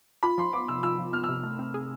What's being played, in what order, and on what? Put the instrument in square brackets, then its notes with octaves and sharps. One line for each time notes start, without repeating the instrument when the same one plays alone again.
[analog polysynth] F4 [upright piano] B5
[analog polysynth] F3 [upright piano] C6
[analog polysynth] B3 [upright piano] D6
[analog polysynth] C3 [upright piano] E6
[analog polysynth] F4 [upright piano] E6
[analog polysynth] F3
[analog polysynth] B3 [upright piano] F6
[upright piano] E6
[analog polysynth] C3
A3
C4
G#4